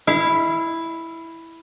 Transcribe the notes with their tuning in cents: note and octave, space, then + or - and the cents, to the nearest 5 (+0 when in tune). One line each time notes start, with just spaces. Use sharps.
E4 +0 F5 -35